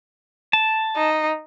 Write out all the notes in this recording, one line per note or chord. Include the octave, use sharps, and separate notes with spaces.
A5
D#4